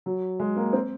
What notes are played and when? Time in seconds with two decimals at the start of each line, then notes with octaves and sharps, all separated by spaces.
0.06 F#3
0.40 G#3
0.56 A#3
0.73 C4